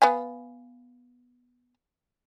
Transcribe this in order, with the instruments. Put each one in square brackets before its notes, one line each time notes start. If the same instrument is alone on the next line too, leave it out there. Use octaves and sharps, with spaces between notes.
[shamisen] B3 F5 G#5